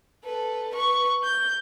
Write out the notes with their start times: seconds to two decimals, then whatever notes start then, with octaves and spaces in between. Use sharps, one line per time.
0.24 A4 B4
0.74 B4 C#6
1.23 G6